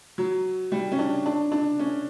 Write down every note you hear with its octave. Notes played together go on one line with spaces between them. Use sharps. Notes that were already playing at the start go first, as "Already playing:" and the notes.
F#3
G3
C#4
D4
D4
D4
C#4